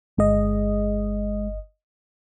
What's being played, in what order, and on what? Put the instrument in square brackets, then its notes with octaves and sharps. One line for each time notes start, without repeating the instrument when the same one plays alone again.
[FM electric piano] G1 D#5 [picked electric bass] G#3